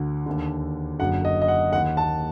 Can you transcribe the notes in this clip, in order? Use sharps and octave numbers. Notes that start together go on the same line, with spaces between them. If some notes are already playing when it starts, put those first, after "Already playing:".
Already playing: D2 D3
D#2 D3
F#1 F#2 D3 F#5
D#5
D#5
F#5
D#2 D#3 F#5
A5